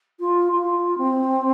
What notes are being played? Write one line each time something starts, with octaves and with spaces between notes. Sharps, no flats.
F4
F4
C4